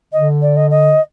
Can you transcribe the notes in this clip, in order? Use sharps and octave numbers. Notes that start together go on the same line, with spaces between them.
D3 D#5
D5
D#5
D#5